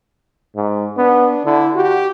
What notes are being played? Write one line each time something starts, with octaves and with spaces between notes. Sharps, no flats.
G#2
B3 D4
D3 E4
F#4 G4